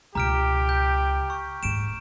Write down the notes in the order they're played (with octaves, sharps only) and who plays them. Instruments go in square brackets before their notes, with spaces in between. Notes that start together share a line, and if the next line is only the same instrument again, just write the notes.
[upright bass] C#2 B2 [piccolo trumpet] G4 [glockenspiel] A#5 F6 D7
[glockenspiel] G6
C#6
[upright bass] D#1 G#2 [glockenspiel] D7 E7